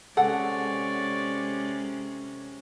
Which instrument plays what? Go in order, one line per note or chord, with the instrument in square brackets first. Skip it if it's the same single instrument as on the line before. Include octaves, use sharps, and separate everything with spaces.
[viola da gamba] C3 G#3 C#4 [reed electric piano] G#4 A4 [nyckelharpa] C#5 D5 [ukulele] F#5